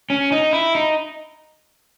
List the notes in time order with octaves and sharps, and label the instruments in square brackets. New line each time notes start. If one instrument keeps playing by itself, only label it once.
[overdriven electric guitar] C#4
D#4
E4
D#4